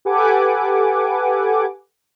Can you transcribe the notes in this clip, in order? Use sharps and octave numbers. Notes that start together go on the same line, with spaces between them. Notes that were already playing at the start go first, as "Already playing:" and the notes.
G4 A4 B4 F#5 G#5 D6